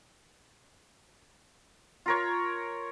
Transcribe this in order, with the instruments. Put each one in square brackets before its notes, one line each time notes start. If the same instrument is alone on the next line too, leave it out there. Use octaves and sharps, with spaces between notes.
[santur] F4 A#4 C#5